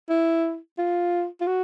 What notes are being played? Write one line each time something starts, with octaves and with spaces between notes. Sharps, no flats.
E4
F4
F4
F#4